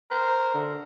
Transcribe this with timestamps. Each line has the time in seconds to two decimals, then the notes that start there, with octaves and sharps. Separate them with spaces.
0.11 A#4 C5
0.54 D3